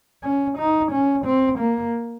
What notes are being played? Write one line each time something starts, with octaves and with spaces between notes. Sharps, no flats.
C#4
D#4
C#4
C4
A#3